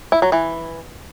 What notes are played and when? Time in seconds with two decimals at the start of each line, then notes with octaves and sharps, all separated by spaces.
0.12 E4
0.22 F#3
0.32 E3